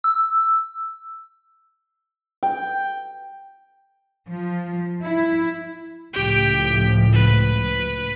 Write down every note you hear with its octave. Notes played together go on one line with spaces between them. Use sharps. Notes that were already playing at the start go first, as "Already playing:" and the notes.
E6
G5
F3
E4
C#2 A2 F3 G4 G5
B4